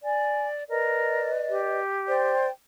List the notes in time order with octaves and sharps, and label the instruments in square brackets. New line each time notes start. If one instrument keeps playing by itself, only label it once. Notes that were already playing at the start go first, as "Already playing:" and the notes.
[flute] D5 [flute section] G#5
[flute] A#4 [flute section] B4 D5 D#5
[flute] G4
[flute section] C5 D5 G5